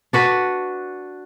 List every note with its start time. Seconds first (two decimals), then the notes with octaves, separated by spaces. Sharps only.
0.13 D4 F#4 B4